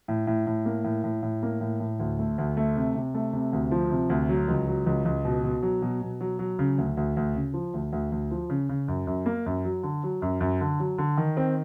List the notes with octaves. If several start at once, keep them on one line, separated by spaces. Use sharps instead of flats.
A2
A2
A2
A#3
A2
A2
A2
A#3
A2
A2
D2
A3
D2
A3
C3
C3
A3
C3
D2
F3
C3
D2
F#3
C#2
F#3
C#2
C#2
B2
B2
F#3
B2
B2
F#3
F#3
C#3
D2
D2
D2
C#3
F3
D2
D2
D2
F3
C#3
C#3
F#2
F#2
A#3
F#2
F#3
D3
F#3
F#2
F#2
D3
F#3
D3
D#3
C4